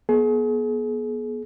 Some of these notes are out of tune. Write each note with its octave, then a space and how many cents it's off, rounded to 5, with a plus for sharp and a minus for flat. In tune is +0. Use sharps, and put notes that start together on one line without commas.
B3 -30 G#4 +35